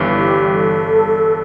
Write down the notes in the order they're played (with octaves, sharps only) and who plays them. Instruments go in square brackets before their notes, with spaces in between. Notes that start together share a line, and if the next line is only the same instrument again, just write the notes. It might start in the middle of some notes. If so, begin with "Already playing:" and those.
Already playing: [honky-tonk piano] G1 G2 E3
[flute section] G4
A4